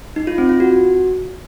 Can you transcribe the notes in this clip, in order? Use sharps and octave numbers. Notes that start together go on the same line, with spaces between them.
D#4
F4
C4
F4
F#4